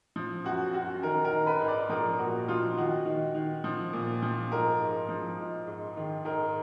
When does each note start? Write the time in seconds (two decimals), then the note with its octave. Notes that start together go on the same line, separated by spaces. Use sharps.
0.16 F3
0.44 F#2 F#4
0.74 F#2 F#4
1.03 D#3 A#4
1.25 A#4
1.31 D#3
1.46 B4
1.60 G#2
1.68 D5
1.89 F3 A#4
2.19 A#2 F#4
2.48 F3 F4
2.77 D#3 F#4
3.06 D#3
3.35 D#3
3.64 F3
3.93 A#2
4.23 F3
4.52 G#2 A#4
4.80 G#2
5.09 F3
5.38 G#2
5.67 G#2
5.97 D#3
6.25 G#2 A#4